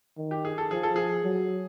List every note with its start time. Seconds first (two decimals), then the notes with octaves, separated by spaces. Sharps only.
0.17 D#3
0.31 G4
0.45 G#4
0.58 A4
0.71 F3 G#4
0.83 A4
0.96 G#4
1.24 F#3